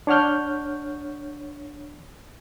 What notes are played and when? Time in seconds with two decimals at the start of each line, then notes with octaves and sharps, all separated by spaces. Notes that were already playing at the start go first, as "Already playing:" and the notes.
0.07 D4 C#5 F#5 F6 G6